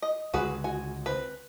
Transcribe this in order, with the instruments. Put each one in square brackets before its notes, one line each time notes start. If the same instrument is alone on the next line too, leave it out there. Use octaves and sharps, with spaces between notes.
[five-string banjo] D#5
[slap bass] C#2 D3 G#3 [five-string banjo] F#4 G#4 B4
[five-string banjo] F#4 G#5
C4 B4